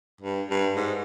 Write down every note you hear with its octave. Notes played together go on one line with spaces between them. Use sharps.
G2
G2
G#2